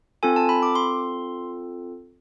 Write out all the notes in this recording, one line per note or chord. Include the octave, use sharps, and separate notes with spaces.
C4 F4 A4 G#5
A5
B5
D6
C6